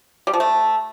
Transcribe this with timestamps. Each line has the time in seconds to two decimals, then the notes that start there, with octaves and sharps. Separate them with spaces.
0.27 G3
0.34 F3
0.40 A3